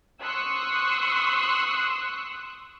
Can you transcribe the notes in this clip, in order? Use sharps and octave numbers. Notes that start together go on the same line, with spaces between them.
C6 C#6 D#6 E6 F#6